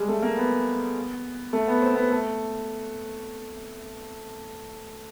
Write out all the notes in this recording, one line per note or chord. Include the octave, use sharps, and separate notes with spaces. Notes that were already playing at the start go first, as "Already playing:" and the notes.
Already playing: G3 G#3
A3
A#3
B3
A3
B3
C4
B3
A3